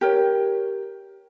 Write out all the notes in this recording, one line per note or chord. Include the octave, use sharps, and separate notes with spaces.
G4 A#4 C#5